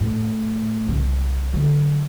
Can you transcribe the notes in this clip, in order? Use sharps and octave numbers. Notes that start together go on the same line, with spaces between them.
A2
C2 C#3
D3 F#3